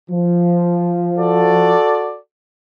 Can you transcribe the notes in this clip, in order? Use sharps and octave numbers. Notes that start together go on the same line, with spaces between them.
F3
F#4 A4 D5